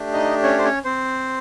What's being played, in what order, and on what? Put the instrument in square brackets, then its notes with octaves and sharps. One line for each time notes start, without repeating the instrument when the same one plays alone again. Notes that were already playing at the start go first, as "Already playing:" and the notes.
Already playing: [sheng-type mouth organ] A3 D4 G4
D#4 D#5
C#4 C#5
C5
C#4 C#5
C4 C5